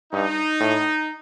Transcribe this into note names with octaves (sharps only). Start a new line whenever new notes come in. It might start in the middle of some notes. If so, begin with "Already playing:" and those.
G2 D#4
A2